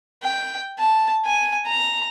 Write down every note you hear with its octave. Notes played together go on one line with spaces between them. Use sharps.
G5
A5
G#5
A#5